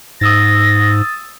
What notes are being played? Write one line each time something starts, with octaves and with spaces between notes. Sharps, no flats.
G#2 D#6 E6 A6 A#6